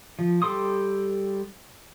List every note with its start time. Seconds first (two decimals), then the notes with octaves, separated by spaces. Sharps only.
0.19 F3
0.42 G3 G4 A4 C6 D#6